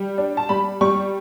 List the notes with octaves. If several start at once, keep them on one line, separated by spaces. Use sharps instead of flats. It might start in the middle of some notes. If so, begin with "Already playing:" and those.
Already playing: G3
D4
A5
G3 B5
G3 C#6